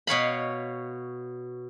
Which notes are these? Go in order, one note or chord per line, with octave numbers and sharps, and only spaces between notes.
B2 C#5 F5 B5